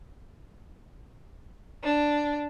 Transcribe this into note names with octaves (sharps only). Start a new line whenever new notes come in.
D4